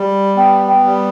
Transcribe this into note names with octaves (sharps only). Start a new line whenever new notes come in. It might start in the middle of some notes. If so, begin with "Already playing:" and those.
Already playing: G3
B3 G5
G5
G3